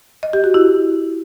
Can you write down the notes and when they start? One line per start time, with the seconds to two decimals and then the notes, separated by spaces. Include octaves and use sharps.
0.23 D#5
0.33 G4
0.44 F#4
0.54 E4